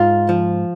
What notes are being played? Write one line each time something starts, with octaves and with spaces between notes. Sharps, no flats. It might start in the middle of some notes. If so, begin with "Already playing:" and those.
Already playing: G#2 F4
F3